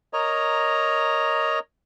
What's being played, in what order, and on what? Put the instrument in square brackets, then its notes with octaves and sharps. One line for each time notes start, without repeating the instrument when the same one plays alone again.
[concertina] A#4 C#5 D#5 A#5